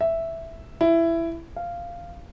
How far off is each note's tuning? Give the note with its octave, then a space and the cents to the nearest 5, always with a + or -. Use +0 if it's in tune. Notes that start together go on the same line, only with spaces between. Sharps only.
E5 +0
E4 +15
F5 -10